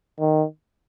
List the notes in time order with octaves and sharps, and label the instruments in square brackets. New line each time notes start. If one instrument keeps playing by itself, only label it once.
[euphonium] D#3